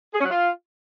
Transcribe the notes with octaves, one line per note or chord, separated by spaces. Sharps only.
G#4
C#4
F#3
F4